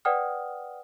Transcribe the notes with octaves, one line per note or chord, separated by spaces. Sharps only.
B4 D5 F#5 G5 D#6 F6